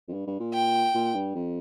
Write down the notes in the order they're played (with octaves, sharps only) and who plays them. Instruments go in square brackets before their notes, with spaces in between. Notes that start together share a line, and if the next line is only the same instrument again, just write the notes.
[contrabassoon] F2
G2
G2
A#2
[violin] G5
[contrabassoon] A#2
G2
F2